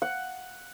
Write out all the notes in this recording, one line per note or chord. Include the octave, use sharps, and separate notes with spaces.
F#5